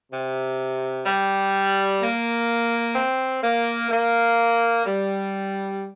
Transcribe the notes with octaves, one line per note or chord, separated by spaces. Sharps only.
C3
G3
A#3
C4
A#3
A#3
G3